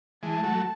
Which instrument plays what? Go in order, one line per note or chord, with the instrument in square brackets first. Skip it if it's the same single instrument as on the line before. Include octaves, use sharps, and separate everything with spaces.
[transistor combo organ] E3 G#3 [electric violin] A5
[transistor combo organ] F#3 A3